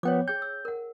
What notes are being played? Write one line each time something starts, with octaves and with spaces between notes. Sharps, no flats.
F3 B3 C#5 G5 D6
G#4 G5 G6
E6
A#4 F#5